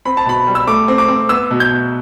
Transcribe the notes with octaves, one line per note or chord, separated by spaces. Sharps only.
C4 B5
A5
B2 B5
G3
E6
A3 D6
C4
D6
C4
B3 E6
B2
G6
B2